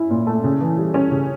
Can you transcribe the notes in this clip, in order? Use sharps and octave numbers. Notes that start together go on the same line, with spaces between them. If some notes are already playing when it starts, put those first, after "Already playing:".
Already playing: C#4 E4
A#2
A3
C#3
E3
G3
C#4
C#3